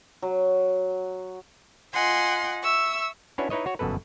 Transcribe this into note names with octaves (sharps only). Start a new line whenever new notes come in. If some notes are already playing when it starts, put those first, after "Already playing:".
F#3
F4 D#5 F#5 G#5 C6
E5 C#6 E6
C#4 D4 E4 F#4 B4 C#5
D#4 E4 B4 C#5 D#5
F#4 C#5
G1 F#2 B2 A4 B4